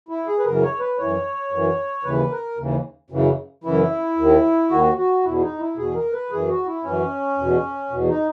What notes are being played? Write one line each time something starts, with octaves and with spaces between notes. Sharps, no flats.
E4
G#4
B4
F#2 C#3 E3 A#4
C#5
B4
F#2 E3 C#5
F#2 E3
D#2 C#3 E3 B4
A#4
D#2 C#3 E3
F#2 C#3 E3
F#2 C#3 E3 E4
D#2 D#3
D#2 D#3 F#4
F#4
E2 B2 E4
E4
D#4
E4
E2 B2 G#4
A#4
B4
F#2 E3 G#4
F#4
E4
F#2 E3 C#4
E2 B2
E2 B2
D#4